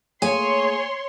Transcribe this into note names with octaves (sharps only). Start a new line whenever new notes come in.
A3 A#3 G#4 C#5 G#5 C6